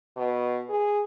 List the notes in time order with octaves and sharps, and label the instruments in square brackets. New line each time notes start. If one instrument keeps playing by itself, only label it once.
[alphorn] B2
G#4